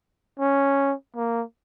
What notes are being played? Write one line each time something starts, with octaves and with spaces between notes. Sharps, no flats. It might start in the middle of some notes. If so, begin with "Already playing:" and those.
C#4
A#3